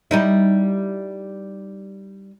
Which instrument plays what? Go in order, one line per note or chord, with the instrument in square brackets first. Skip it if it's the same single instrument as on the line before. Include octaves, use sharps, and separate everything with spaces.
[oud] G3 D#4 E4